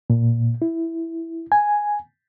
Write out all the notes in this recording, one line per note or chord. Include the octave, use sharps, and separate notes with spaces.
A#2
E4
G#5